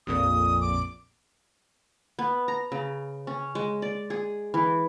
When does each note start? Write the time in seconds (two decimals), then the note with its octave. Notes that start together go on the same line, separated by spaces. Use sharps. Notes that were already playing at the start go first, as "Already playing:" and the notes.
0.07 A#1 F2 A#2 D#6
0.61 D6
2.19 B3
2.48 A#5
2.72 C#3
3.27 C#4
3.55 G#3
3.82 D5
4.10 G#4
4.54 E3